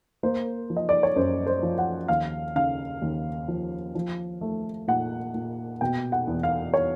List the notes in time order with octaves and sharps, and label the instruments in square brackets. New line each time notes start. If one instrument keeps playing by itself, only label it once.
[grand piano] A#3 C5
F3
D#5
D5
C#5
F#2 C5
C5
F3
F#5
D#2 F5
C#3 F5
D#2
F3
F3
A3
A#2 F#5
A#2
B2 G5
F#5
E2
F5
C#5